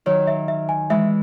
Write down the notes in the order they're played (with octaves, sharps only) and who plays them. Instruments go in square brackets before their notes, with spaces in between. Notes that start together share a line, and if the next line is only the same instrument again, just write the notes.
[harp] D#3 F#3 [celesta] C#5
[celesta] E5
E5
G#5
[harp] E3 G#3 [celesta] E5